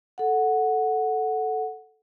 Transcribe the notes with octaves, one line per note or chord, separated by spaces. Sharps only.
A4 F#5